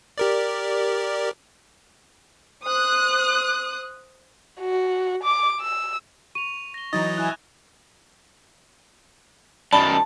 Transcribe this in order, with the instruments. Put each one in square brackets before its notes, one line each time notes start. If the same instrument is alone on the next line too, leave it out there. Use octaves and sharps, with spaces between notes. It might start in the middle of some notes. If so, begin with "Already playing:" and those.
[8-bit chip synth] G4 A#4 D5
[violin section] C5 D#6 F#6
[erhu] F#4
D6
E6
[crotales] C#6 F7 [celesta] D#7
[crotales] A#6 G7
[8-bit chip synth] E3 F#3 D#5 [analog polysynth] D#4 [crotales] D#6 G#6 [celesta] A6
[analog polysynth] E4 G#5 [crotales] F#6 G#6 E7
[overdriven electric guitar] F#2 D#3 [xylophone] D5 B5 [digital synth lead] A5